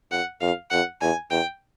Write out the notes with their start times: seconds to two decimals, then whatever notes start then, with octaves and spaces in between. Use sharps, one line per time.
0.11 F2 F#5
0.41 F2 F5
0.71 F2 F#5
1.01 E2 G#5
1.31 E2 G5